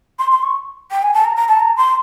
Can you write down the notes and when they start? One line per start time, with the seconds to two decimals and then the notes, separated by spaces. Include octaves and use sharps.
0.19 C6
0.31 C6
0.43 C#6
0.91 G5
1.03 G#5
1.14 A5
1.25 A#5
1.36 A#5
1.48 A5
1.60 A#5
1.77 C6